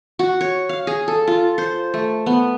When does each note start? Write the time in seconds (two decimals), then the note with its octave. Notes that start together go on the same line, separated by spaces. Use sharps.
0.19 F#4
0.41 C#5
0.69 F5
0.87 G#4
1.08 A4
1.27 F4
1.58 C5
1.94 A3
2.26 B3